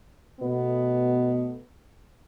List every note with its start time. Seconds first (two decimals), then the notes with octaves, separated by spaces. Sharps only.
0.41 B2 A3 B3